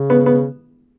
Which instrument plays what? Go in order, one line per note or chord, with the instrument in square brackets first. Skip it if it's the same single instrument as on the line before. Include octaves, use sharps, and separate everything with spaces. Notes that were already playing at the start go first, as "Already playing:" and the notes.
Already playing: [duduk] C#3
[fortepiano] B3
B3